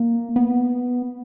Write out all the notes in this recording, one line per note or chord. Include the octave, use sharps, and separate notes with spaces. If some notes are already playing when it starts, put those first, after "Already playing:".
Already playing: A#3
B3